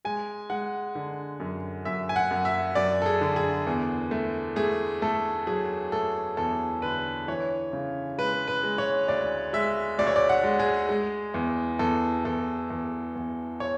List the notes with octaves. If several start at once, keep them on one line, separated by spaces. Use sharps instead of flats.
G#3 G#5
G#3 F#5
D3
F#2
F#2 E5
G#5
F#5
F#2
E5
F#2 D5
A4
G#4
D3
G#4
E2
A3
A3 G#4
A3 A4
F#3 G#4
A3 A4
E2 A4
D3 B4
E3 C#5
C#3
G#3 B4
B4
G#3
C#5
D2 D5
G#3 E5
D2 D5
C#5
D5
F#5
G#3
G#4
G#3
E2
E2 A4
E2 A4
E2
E2
C#5